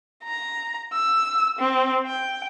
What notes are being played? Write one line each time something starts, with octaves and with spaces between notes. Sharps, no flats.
A#5
E6
C4
G5